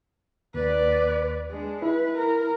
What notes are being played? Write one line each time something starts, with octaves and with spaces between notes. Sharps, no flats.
D#2 B4 D5
G#3 D4
E4 B4
A#4